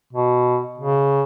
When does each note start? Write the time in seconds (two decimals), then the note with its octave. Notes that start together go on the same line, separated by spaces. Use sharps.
0.13 B2
0.78 C#3